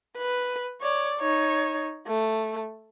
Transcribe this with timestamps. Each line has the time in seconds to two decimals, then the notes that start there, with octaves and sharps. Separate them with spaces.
0.18 B4
0.81 C#5 D5
1.20 D#4 C#5
2.07 A3